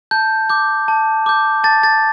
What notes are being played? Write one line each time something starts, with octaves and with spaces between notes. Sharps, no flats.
A5 G6
D6 G6
A5
D6 G6
A5 A6
A6